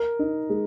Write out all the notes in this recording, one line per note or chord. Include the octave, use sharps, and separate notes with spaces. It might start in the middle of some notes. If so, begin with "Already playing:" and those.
Already playing: A#4
D#4
G#3